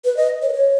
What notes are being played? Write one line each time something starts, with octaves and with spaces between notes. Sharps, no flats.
B4
D#5
C#5
B4
C#5